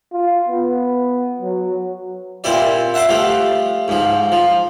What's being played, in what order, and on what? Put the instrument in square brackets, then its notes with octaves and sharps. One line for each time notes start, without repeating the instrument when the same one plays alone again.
[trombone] F4
B3
F#3
[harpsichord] A#2 C4 E4 G4 D5
E5 F#5 A5 C6 D6
F3 A3 G4
G#2 F3
F3